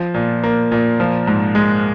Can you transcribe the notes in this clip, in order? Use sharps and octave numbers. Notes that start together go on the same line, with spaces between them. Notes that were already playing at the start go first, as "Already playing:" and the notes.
Already playing: F3
A#2
A#3
A#2
F3
G#2
G#3